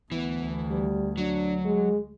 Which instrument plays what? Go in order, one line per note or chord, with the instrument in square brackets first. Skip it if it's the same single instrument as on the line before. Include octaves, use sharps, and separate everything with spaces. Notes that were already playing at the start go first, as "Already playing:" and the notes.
[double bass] D2 [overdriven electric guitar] E3 [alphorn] B3
[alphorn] G3
[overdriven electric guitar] F#3 [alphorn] D4
[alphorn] G#3